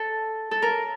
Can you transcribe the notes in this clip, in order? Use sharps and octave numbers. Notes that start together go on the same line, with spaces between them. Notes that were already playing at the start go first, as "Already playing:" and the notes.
Already playing: A4
A4
A#4